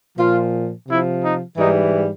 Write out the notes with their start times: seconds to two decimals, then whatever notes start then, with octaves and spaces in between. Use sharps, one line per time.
0.18 A#2 F3 F4
0.87 C3 F3 E4
1.22 D#4
1.56 G#2 E3 G3 D#4